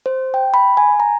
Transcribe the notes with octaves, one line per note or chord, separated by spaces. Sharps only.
C5
G5
B5
G#5
A#5